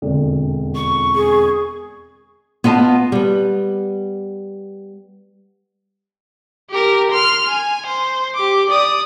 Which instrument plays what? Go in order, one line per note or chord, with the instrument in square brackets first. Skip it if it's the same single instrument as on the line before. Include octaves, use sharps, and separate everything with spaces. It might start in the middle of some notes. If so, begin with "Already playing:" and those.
[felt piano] E1 F2 D3
[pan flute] C#6
[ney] G#4
[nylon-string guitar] B3 F4 D#5 A5
G3 B3
[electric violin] G4 A#4
C6 F6
G#5
C5
G4 D6
D5 D#6